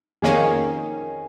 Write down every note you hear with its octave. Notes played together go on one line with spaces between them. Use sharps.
F2 D#3 A#3 C#4 G#4